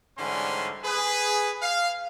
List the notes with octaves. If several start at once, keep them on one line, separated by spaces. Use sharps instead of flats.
G#2 D3 E3 G3 C#4 C6
G#4 B4
F5